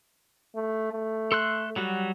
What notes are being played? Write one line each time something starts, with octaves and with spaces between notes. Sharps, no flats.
A3
A3
A4 C6 F#6
F#3 G3 F#4